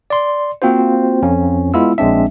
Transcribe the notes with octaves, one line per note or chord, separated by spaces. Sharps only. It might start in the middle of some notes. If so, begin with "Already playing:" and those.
D5 C6
A#3 C4 F4 F#4 C5
F2 C#4
G#3 B3 E4 F4 E6
A#1 G#3 C4 D4 E5